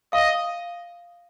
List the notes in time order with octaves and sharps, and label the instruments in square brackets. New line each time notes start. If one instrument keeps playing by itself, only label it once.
[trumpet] D#5 [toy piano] F5